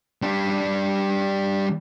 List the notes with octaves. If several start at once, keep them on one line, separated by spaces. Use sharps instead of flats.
G3 D4